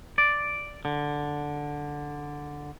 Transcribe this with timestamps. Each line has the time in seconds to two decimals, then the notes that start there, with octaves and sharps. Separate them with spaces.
0.18 D5
0.85 D3